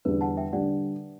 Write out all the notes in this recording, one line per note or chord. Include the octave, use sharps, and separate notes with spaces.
E2 D3 G3 B4
F#5 A5
E5 G5
D3 G3 D5 F#5